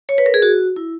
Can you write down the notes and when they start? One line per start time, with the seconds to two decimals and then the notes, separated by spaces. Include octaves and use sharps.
0.09 C#5
0.18 B4
0.26 A#4
0.34 G#4
0.42 F#4
0.76 E4